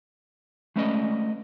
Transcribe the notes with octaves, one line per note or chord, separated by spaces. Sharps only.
G#3 A3 C#4 B4 D5 D#5